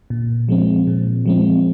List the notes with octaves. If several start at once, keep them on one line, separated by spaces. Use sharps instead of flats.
A#2
F3 G#3 C4
A#2
F3 G#3 C4